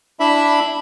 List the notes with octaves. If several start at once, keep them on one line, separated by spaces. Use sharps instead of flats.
D4 E4 E5 B5